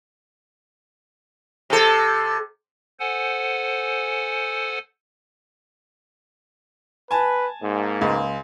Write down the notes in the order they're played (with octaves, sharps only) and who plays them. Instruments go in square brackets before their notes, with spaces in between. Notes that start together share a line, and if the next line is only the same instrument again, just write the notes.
[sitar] C3 A4
[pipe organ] A4 C5 F#5 G#5
[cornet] B4 [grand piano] G#5 A5
[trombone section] G#2 [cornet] A#3
[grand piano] C#2